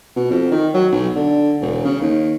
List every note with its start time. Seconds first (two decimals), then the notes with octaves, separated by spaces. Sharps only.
0.16 B2
0.31 F2
0.52 D#3
0.74 F#3
0.92 B1
1.16 D3
1.61 E1
1.85 C#3
2.01 D#2